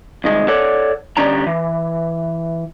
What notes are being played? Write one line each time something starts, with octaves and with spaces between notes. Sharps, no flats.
C2 D#3 G#3
A4 C#5 D5 F#5
D3 G3 C#4 D4 A#5
E3